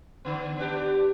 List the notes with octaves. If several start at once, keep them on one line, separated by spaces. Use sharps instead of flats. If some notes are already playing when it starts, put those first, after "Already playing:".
D3 B3
B3 D4 G4